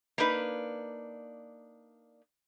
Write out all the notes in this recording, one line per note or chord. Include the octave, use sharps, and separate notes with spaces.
A#3 D4 D#4 B4